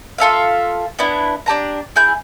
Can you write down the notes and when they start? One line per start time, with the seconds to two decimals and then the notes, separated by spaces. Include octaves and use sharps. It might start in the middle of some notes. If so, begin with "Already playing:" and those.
0.18 F4 A4 E5 F5
0.99 B3 D4 E4
1.46 D4 G4 A5 A#5
1.96 E4 G#4 G6